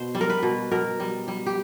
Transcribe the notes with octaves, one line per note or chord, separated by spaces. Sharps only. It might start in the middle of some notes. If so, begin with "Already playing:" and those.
Already playing: B2 C5
G3
A#4
B4
B2
B2 A#4
G3
G3
G4